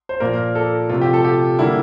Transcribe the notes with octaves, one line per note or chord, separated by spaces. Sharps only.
C5
A#2 F3 A#3 A#4
A4
C3 F3 A3 F4
G4
A4
G4
D3 G3 A#3 E4